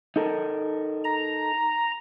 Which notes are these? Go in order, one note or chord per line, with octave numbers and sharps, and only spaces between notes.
D#4 A4 A#4
A#5